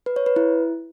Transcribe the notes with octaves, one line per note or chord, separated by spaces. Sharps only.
B4
C#5
B4
E4